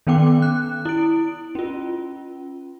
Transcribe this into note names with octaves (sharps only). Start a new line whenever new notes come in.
D#3 B3 C#4 G5 D6
F#6
E4 D7
C#4 F4